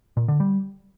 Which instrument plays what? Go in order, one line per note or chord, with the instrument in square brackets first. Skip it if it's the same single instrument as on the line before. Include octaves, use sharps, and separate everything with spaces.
[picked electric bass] A#2
D3
G3